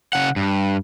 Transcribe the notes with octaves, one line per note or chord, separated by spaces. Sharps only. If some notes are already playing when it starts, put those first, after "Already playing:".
C#3 F#5
G2